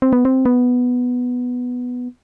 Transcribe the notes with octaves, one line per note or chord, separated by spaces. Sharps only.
C4
B3
C4
B3